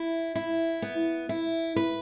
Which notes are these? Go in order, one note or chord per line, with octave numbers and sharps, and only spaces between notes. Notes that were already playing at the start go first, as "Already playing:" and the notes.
Already playing: E4
E4
B3
E4
B4